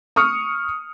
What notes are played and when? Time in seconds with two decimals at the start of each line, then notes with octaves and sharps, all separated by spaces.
0.16 C#6 D#6 F6 C#7